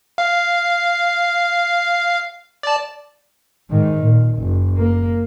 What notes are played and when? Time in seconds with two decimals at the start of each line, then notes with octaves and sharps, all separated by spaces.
0.18 F5
2.63 D5 A5
3.70 G#2 D#3
4.02 A#2
4.38 F#1
4.77 A#3